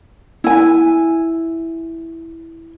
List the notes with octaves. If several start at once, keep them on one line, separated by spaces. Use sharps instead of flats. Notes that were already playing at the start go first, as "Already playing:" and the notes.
E4 G#5